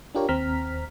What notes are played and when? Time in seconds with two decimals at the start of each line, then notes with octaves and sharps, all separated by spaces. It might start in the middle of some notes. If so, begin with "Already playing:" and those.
0.15 D4 F4 G4 A#4 C#5
0.29 D#2 C4 A#5 F6 B6